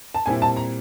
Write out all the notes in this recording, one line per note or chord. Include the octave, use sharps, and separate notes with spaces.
A5
A#2 G3 C4 E4 G#5
A5
A#5